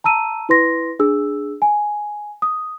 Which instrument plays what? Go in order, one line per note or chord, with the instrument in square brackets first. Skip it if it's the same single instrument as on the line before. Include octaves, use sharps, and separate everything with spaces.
[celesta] A5 A#5 E6 D#7
E4 B4 C6 A#6
D4 G#4 E6
G#5
D#6